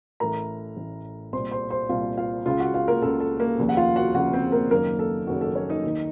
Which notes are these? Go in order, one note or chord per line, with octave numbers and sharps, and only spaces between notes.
A1 A2 A#4 A#5
A1 A2
C2 A#2 C5 C6
C5 C6
C5 C6
C2 A#2 F4 F5
F4 F5
C#2 C#3 F4 F5
F#4 F#5
F4 F5
A#3 A#4
C#2 C#3 A4
A4
A#3 A#4
F1 D#2 C#3
F#5
F4 F5
F#4 F#5
F1 D#2 C#3 F#4 F#5
C4 C5
A#3 A#4
F#1 F#2 D#3 A#3 A#4
A4
F#1 F#2 D#3 F#4
A4
C#4 C#5
D#4 D#5
D#2 D#3